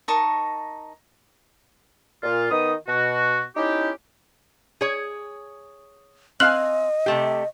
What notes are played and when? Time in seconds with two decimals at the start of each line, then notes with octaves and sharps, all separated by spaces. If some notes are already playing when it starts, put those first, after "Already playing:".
0.08 D#4 A#4 A5 C#6
2.23 A#2 F4
2.51 D#3 B3 D#4 D#6
2.88 B2 F#4
3.56 C#4 D#4 E4 G4
4.81 G#4 C#5
6.40 C4 D#5 F5 G#5 F6 F#6 F#7
7.06 C3 A3 G4